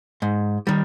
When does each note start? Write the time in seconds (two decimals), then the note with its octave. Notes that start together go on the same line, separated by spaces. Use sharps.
0.22 G#2
0.67 D#3 G3